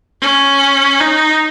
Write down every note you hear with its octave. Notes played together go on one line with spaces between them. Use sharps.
C#4
D#4